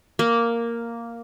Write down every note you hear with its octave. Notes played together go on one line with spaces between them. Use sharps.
A#3